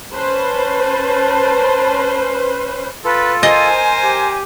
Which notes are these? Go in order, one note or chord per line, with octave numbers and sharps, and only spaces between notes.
C#4 B4 C5 A5
F4 A4 B4
A#4 C5 D#5 G#5
G4